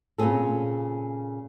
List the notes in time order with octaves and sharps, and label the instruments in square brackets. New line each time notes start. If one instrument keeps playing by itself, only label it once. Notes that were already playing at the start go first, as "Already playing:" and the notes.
[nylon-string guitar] A#2 C#3 E3 C4 G#4 A4